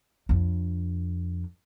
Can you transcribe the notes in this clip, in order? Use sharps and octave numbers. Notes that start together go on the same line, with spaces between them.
F2 D4